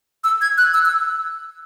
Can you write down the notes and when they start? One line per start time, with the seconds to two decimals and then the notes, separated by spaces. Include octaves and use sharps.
0.24 E6
0.41 G#6
0.58 F#6
0.74 E6
0.86 E6